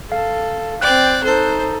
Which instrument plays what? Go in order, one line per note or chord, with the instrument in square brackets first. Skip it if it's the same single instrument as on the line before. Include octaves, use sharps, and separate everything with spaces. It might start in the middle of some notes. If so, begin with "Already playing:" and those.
[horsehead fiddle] A4 [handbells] F5
[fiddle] C4 D5 [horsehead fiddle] G5 [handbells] F#6
[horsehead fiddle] D#4 A4 [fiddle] C5